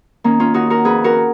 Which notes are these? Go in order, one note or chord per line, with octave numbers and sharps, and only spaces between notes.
D#3 A#3 C#4
C#4 F4
D#3 D#4 F#4
F#4 A#4
F2 G#4 B4
F#4 A#4